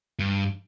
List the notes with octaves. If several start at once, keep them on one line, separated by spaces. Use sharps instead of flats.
G2